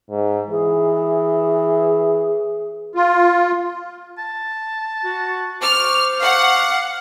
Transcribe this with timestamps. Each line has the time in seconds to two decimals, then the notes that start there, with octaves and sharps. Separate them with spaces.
0.10 G#2
0.49 E3 G#4
2.95 F4
4.18 A5
5.04 F#4
5.62 C5 C#6 D6 F6
6.21 F5 F#5